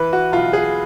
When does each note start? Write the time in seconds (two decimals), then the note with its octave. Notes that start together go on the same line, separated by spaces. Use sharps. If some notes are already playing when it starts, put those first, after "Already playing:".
Already playing: E3 B4
0.13 F#4
0.32 B1 F4
0.53 G#4